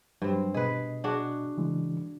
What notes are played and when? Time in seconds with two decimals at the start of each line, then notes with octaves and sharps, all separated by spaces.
0.22 G2 F#3 C4
0.54 B2 G#4 B4 D#5
1.04 D4 F#4 G#4
1.57 C#3 E3 G#3